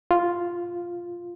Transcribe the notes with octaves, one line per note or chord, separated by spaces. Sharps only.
F4